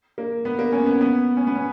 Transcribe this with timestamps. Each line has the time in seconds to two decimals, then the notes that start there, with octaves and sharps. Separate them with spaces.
0.18 A#3
0.45 B3
0.59 A#3
0.72 C#4
0.86 B3
1.01 B3
1.37 C#4
1.47 B3
1.55 C#4